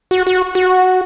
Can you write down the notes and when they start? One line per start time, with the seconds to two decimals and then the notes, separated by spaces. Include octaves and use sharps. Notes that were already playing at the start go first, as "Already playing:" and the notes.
0.11 F#4
0.27 F#4
0.55 F#4